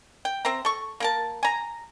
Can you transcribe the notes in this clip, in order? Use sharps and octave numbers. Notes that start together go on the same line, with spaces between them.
G5
C4 C5 E5 A#5
A4 C#6
A#3 A#4 A5
G#5 A#5